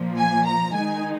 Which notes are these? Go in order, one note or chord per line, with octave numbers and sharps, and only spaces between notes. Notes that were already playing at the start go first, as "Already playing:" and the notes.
Already playing: A#2 F3 A#3
G#5
A#5
D#3 G#3 D#4 G#5